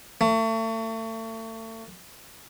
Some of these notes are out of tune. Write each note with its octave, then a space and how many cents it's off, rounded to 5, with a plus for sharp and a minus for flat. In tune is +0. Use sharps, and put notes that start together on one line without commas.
A3 +35